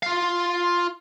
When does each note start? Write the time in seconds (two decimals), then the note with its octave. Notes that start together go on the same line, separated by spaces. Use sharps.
0.03 F4 F5